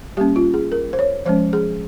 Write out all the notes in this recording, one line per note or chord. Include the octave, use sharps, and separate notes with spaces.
G3 A#3 C#4 G4
F4
G#4
A#4
C5
C#5
F3 G#3 C#4 C5
G#4